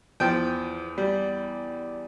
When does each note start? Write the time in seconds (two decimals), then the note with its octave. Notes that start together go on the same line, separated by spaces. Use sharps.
0.20 E2 F3 G5
0.98 G3